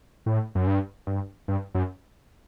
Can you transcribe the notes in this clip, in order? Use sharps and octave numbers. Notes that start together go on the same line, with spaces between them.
A2
F#2
G2
G2
G2
F#2